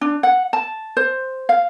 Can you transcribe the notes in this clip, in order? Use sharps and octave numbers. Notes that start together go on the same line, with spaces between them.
D4
F#5
A5
C5
F5